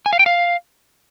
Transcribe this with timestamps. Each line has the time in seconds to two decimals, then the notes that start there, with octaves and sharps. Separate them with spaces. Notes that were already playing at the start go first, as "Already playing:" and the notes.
0.06 G#5
0.13 F5
0.19 G5
0.26 F5